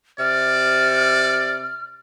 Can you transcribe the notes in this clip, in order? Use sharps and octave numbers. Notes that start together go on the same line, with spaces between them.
C3 D5 F6